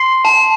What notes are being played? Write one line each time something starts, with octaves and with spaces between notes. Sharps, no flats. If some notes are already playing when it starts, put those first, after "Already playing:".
Already playing: C6 C7
A5